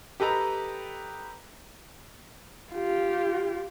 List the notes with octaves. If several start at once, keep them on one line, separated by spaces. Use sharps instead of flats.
G4 A4 B4 D#5 A#5
F4 G4